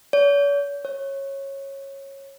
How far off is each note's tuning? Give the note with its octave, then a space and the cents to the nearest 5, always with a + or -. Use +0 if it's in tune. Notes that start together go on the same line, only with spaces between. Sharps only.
C#5 +45
C#5 -15